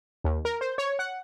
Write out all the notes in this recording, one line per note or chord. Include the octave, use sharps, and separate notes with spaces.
D#2
A#4
C5
C#5
F#5